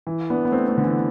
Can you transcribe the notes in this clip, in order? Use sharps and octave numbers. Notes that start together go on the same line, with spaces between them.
E3
B3 D4
B3
A3 C4
A3 C4
D3
E3